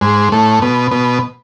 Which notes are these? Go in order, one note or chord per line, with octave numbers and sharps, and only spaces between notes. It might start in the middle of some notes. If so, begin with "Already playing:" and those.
G#2
A2
B2
B2